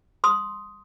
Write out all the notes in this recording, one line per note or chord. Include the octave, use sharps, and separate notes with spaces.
C6 D#6